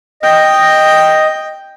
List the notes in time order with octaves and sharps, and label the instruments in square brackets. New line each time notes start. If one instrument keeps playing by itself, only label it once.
[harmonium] D#5 [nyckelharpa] G5